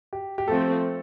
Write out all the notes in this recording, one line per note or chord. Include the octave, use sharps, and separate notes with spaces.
G4
G4
F3 A3 C4 A4